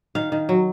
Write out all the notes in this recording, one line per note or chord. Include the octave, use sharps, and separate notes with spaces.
D#3 F5
D#3
F#3